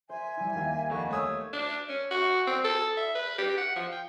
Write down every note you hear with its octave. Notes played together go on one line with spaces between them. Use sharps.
C5 E5 G#5
G3 E4
D#2 F5
F2 D3 C#6
A3 C#5 C#6 D#6 E6
D4
C#4
F#4
C4
A4
E5
B4
G4
F#5
F3
G5